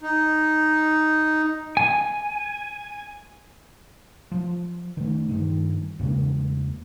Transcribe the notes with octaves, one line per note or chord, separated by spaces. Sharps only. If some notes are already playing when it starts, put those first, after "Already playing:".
D#4
G#5
F3
D#3 A3
G2 D#3
E2 C#3 G#3 A#3